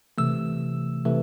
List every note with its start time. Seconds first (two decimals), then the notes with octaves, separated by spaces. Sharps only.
0.18 C3 E3 A3 E6
1.05 C3 E3 A3